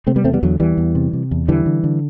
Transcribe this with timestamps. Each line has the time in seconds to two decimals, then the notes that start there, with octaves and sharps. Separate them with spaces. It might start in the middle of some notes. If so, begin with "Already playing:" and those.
0.07 C3 A3 C4
0.16 G3 B3
0.24 E2 A3 C4
0.34 G3 B3
0.43 E2 D3 F#3
0.60 E2 E3 G3
0.77 E2
0.95 C3
1.13 C3
1.31 E2
1.48 D3 E3 G3
1.66 D3
1.84 D3